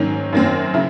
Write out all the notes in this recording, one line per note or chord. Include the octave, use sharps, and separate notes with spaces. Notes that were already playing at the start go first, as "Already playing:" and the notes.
Already playing: G#2 D#3 F#3 C#4
F#2 D#3 F#3 C4
C#3 E4